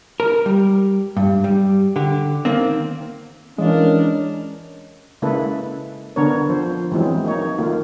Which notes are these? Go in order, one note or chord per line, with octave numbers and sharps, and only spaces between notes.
A#4
G3
G2
G3
D3 G4
D#3 A#3 C4
E3 G#3 C#4 D4 A#4 D#5 F5
C#3 G#3 A#3 E4 A4 B4
D3 B3 D4 A#4 C#5
F3 C5
E3 F#3 G#3 C4
A#3 D#4 C#5
D#3 A3 A#3 F4